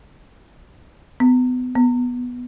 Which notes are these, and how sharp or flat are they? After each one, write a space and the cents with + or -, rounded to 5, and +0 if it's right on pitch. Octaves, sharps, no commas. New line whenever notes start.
B3 +30
B3 -5